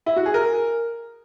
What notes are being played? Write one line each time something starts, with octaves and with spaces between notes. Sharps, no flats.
E4
F#4
G#4
A#4